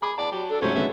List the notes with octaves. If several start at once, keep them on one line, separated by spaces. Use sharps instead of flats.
G#4 B5 D6
E2 D5 A5
F#3 G4
D4 A4
G#2 C3 F#3 A3 C#4 C5
D3 F#3 G#3 B3 E5